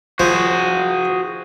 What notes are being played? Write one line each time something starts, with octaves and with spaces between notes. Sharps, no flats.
F3 F#4 G#4